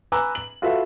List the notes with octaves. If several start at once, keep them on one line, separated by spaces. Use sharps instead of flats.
B4 G#5 A#5 D6 E6
F#7
F4 F#4 A4 B4 E5